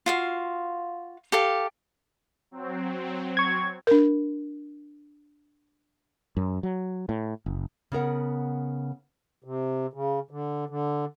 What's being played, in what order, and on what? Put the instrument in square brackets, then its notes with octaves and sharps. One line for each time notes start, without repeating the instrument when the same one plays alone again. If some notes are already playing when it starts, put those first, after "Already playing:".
[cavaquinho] F4 F#4 F5
G4 A4 F5
[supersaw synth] F#3 C4
[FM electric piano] C#6 G#6
[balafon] D4 A#4
[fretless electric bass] F#2
F#3
A2
F#1
[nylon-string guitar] C#3 B3 A#4 F#5
[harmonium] C3
C#3
D3
D3